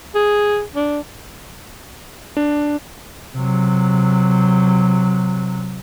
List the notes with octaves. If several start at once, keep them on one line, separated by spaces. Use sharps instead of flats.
G#4
D4
D4
C3 F#3